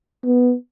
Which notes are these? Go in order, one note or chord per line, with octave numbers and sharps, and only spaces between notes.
B3